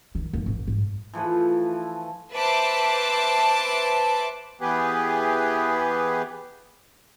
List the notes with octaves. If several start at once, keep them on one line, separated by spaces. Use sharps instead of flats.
D#3
D#2
A1
G#2
E3 F3 A3 B4
B4 C5 E5 A5 D6
E3 B3 G4 G#4 B4